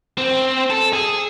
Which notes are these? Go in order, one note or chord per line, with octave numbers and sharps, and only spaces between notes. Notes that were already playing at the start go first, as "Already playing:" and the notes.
C4
A4
G#4